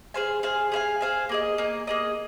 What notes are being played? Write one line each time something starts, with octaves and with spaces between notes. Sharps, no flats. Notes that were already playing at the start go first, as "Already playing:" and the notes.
G#4 C5 F5 G#5
G#4 C5 F5 G#5
G#4 C5 F5 G#5
G#4 C5 F5 G#5
A#3 G#4 D#5
A#3 G#4 D#5
A#3 G#4 D#5